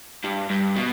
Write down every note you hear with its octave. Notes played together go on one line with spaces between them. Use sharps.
G2
G2
B2